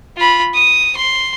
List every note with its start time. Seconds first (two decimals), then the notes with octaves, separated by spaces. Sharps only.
0.17 F4 B5
0.54 D#6
0.96 C6